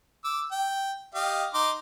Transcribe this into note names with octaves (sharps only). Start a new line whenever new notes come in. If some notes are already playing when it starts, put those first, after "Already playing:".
D6 E6
G5
G4 D#5 F5
D#4 C6 D6